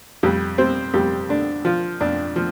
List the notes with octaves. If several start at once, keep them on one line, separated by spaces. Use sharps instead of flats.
F2 G3 G4
G3 C4 C5
F2 G3 G4
D3 D4
F3 F4
F2 D4
F3